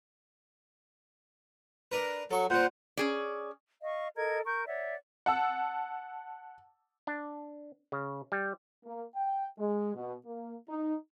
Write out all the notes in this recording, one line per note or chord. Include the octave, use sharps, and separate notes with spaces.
D4 A#4 B4
F#3 A4 C#6
A#2 C4 C5 F#5
C#4 G#4 D5
D#5 F5 C#6
A4 A#4 D#5 G#6
A#4 C#6 G6
C#5 D5 E5 F#5
F#5 A5 E6
D4
C#3
G3
A#3
G5
G#3
B2
A#3
D#4